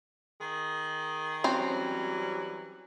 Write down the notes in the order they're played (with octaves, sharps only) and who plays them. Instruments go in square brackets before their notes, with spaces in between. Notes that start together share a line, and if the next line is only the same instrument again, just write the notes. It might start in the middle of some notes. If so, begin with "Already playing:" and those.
[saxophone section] D#3 G#4 D#5
[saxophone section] E3 F#3 G3 [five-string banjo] C4 C#4 C5